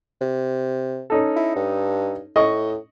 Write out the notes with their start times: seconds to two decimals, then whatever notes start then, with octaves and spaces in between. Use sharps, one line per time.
0.21 C3
1.10 C#4 D#4 A4
1.36 E4
1.56 G2
2.36 A2 D#5 C#6